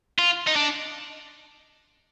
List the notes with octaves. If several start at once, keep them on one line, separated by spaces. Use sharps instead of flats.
F4
D#4
D4